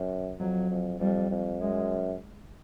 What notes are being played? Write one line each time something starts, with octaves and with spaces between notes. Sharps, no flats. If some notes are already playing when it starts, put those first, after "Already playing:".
Already playing: F#2
F2 F#3
F2
F2 G3
F2
F#2 G#3